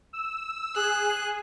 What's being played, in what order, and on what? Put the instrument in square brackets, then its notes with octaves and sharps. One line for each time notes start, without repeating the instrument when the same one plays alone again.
[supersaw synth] E6
[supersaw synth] G#4 [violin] F#6